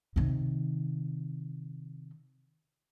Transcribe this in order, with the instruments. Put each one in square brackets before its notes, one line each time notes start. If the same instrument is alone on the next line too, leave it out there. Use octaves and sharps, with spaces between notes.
[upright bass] C3 D#3